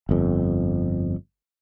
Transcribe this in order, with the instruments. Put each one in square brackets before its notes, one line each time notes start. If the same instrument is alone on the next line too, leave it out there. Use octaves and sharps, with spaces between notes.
[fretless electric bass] G1 F2